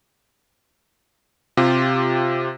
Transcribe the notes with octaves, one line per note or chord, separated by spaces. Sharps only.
C3 F4 G4